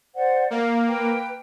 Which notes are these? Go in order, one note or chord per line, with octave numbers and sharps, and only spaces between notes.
C5 D5 F#5
A#3 F5
B4 G5